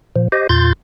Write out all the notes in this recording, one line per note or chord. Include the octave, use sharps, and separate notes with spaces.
A#2 F3
G4 C5 D#5
E2 A#2 F4 C6 G6 A6